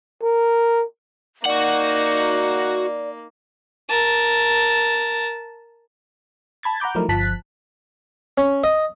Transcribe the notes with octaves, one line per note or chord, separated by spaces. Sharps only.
A#4
A#3 D#4 F#4 D5 F#5
A#4 A5
A5 B5 G#6 A6
F#5 A#5 B5 D6 G6
F3 F#3 A3 D#4 E4 A#4
G1 F3 A5 F#6 B6
C#4
D#5